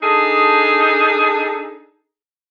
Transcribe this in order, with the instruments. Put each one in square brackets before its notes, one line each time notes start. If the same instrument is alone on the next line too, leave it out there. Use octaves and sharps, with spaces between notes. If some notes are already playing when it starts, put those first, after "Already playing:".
[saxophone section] D4 D#4 G#4 A4